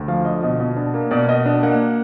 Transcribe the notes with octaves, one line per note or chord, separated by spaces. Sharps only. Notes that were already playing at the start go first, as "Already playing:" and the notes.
Already playing: D2
F3 F5
D3 D#5
B2 D#5
B2
D4
A#3
B2 D5
B2 D#5
D4 D#5
A#3 F#5